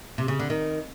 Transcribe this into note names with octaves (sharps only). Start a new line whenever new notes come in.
C3
C#3
D3
D#3